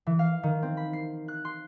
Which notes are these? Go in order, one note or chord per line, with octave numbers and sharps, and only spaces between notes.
E3
F5
D#3
C4
B5
C7
F#6
C6